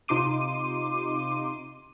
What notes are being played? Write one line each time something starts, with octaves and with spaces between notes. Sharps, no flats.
C3 D#4 F4 C6 D6 D#7